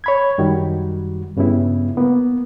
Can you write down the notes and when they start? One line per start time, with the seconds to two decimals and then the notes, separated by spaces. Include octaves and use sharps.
0.04 C#5 B5 G#6
0.38 F#2 D#3 G3 F#4
1.37 G2 C#3 G3 B3 E4
1.97 A#3 B3